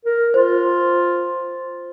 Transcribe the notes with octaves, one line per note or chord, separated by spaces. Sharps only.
A#4
F4 C5